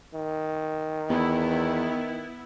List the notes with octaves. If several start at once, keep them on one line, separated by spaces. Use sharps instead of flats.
D#3
E2 B3 E4